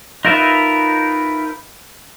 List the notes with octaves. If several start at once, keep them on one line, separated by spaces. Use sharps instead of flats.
D#4 F4 A#4 B4 E5